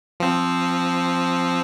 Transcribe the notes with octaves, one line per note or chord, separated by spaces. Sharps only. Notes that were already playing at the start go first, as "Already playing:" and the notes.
F3 C4